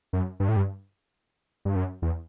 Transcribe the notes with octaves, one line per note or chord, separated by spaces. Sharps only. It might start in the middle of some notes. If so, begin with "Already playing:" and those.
F#2
G2
A2
G2
G2
F#2
E2